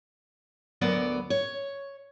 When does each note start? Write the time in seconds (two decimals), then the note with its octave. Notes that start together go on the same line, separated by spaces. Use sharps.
0.81 D2 F#3 B3 A#4 D5
1.30 C#5